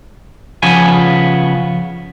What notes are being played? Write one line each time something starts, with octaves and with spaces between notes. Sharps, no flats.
C#3 F3 B3 G#5